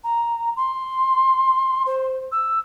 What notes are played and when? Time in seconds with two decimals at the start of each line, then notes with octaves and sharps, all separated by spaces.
0.04 A#5
0.56 C6
1.86 C5
2.32 E6